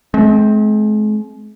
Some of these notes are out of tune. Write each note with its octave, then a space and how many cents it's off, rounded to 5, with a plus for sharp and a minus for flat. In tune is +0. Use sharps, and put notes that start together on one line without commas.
G#3 +45 C4 +0